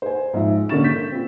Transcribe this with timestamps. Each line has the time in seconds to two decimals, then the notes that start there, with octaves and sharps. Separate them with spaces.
0.02 C5 G#5
0.33 G#2 F3 E5
0.69 D3 A#3 C#4 C#6 A6 E7
0.84 G6 B6
1.12 C4 F4